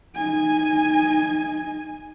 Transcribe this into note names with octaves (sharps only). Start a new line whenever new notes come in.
D#4 G#5